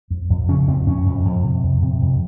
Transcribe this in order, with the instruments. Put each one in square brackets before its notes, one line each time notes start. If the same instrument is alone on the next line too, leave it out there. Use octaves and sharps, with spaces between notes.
[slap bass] F2
F2
C#3 C#4
F2 C4
F2 C#4
F2
F2
C3
F2
C3
F2